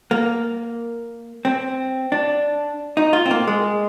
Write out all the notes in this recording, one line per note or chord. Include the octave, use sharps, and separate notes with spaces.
A#3
C4
D4
D#4
F4
C4
A#3
G#3